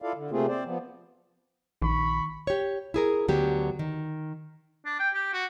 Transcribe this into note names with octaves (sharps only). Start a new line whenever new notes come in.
E4 F4 A4 D5 F5
D3
C3 A3 A#3 C4 F4 G#4
C4 C5 D5
F3 B3
A#1 D#3 B5 C#6
G4 C#5
E4 G#4 A#4
D2 D3 F#3 B3 G4
D#3
D4
G5
G4
F#4